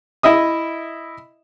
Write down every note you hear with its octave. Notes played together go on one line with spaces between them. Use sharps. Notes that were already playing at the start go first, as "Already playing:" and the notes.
E4 D#5 E5 D#6